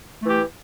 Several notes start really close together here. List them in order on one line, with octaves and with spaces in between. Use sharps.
A3 E3 G4